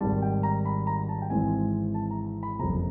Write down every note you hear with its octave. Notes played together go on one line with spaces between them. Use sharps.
G#1 G#2 D#3 G3 A5
G5
A#5
B5
A#5
A5
G5
G#1 G#2 E3 G#3 C4 G#5
A5
A#5
B5
F#1 F2 C3 A#5